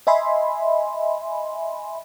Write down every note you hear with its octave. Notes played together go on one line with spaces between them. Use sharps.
D#5 E5 G#5 B5 C6